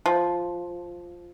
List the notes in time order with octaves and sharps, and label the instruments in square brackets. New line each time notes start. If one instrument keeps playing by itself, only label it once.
[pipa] F3